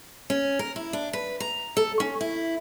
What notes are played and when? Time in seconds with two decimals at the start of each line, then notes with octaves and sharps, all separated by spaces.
0.30 C#4
0.59 A#4
0.76 E4
0.93 D4
1.13 B4
1.40 A#5
1.77 A4
2.00 C#4
2.21 E4